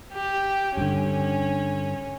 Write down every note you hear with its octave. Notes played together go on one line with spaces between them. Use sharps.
G4
G2 D3 C#4